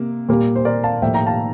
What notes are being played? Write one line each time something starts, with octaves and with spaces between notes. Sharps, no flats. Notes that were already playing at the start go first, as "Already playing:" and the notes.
Already playing: C3 A#3
A#2 G3 A#3
C5
A#4 D5
F5 A5
A2 F3 A#3 E5 G5
G5 A#5
F5 A5